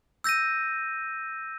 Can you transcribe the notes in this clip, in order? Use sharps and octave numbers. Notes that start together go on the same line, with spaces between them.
E6 G6 A#6 D#7